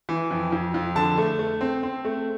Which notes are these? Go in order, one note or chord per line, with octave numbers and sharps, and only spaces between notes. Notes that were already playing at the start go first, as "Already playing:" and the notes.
E3
F2
F2
F2
D3 A5
A3
A3
C4
C4
A3